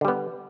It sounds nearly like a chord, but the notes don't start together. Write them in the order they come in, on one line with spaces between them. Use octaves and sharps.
D3 G3 B3